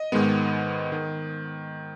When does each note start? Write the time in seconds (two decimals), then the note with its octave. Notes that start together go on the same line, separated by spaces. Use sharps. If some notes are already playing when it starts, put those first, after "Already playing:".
Already playing: D#5
0.12 G#2 D#3 G#3 B3
0.92 D#3